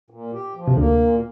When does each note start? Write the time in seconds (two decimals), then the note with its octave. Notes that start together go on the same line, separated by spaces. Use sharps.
0.10 A#2
0.33 G4
0.55 F3
0.68 C3
0.77 D2 D3 A#3
0.99 A#2